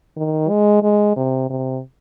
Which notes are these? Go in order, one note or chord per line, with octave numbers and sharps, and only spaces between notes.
D#3
G#3
G#3
C3
C3